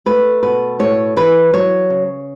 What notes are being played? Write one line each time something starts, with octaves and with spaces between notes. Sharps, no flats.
A3 B4
B2 B4
A2 C#5
E3 B4
F#3 C#5
C#3